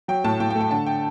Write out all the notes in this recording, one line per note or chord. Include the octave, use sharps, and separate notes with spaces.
F#3 G5
A2 A5
A2 G5
G5
A3
G5
D3 A5
G5